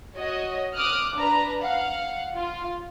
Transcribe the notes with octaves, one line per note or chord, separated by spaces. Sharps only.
F#4 C#5 D#5
D6 D#6 F6 F#6
D4 B4 A#5
F5 F#5
F4